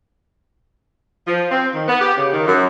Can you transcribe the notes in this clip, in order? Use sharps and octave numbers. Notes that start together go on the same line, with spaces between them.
F3
C4
D#3
B3
G4
C#3
D#3
F#2